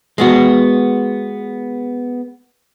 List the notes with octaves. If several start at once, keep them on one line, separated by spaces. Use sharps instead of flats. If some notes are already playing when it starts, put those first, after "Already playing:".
G#3 B3 F#4